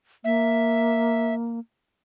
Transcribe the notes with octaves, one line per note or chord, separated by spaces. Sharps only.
A#3 E5